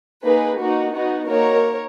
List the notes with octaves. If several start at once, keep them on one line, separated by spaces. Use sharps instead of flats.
A#3 D#4 G#4 B4
A#3 D#4 F#4
B3 D#4 F#4
A#3 D#4 F#4 A#4 C#5